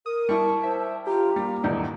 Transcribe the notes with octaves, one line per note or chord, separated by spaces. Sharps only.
A#4 D#6
G3 E4 A5 C#6
C5 E5
F4 G4 A#5
G3 A#3
D#1 E2 G#2 D5